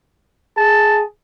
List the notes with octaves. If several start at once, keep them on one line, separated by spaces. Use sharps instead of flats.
G#4 A5